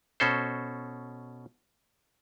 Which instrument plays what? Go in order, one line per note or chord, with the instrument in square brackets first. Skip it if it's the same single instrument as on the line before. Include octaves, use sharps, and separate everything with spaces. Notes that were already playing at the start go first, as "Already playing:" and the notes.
[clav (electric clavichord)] B2 C#4 A4 C5